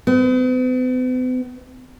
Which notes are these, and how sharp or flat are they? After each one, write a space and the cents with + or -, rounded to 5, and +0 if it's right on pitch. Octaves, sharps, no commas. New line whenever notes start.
B3 +45